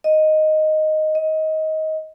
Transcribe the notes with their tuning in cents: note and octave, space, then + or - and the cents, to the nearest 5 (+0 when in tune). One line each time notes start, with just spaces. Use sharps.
D#5 +0
D#5 +20